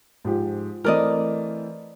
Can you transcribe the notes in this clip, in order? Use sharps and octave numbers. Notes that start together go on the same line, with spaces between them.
G#2 F3 G4
E3 A3 C4 A#4 D5 D#5